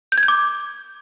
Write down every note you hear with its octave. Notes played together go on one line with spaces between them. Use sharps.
G6
G#6
G6
D6